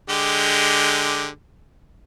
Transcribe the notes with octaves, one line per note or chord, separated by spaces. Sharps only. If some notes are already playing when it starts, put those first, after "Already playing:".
D3 G#3 G4